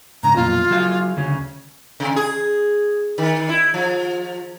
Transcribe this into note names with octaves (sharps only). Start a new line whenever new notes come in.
G#2 C#3 A#5
B1 F2 A#2 F4
F#3 G#4 F5
D2 C#3 C#4
C3
G#4
D#3
E4
F3